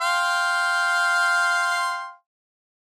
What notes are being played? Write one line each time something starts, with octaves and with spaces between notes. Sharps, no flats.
F5 G5 C6